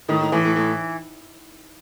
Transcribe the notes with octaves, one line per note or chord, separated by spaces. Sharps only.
A2 D#3
A2
A2 E3
A2
A2